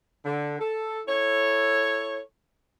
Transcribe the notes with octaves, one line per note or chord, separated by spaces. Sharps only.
D3
A4
E4 A4 C#5